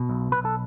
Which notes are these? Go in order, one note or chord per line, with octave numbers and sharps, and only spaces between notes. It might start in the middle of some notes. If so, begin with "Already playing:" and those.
Already playing: B2
B1
B1 B4
A4